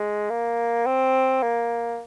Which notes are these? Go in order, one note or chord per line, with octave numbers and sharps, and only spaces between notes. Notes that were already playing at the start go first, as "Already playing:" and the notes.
Already playing: G#3
A#3
C4
A#3